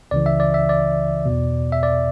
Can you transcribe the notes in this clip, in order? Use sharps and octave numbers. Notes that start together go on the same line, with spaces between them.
C#2 C#3 E3 D5
E5
D5
E5
D5
E2 B2
E5
D5